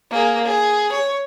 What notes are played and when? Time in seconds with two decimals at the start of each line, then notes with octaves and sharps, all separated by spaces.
0.11 A#3 G#4
0.44 G#4
0.92 C#5